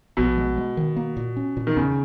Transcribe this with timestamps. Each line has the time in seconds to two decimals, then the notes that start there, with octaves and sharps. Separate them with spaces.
0.17 A#1 B2
0.38 G#3
0.58 G#3
0.77 D#3
0.96 A#3
1.17 A#2
1.37 C#4
1.57 A#2
1.67 D#3
1.76 E2 C#3